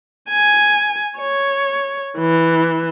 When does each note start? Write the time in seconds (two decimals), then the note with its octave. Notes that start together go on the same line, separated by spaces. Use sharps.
0.30 G#5
1.19 C#5
2.18 E3